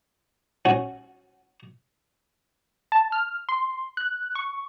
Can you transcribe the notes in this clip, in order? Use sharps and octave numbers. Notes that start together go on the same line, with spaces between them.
C#4 F#4
A5
F6
C6
F#6
C#6